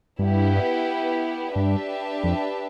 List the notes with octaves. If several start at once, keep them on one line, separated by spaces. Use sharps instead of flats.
G2 B3 E4 G4 B4
G2 D4 G4 B4 E5 A5
F2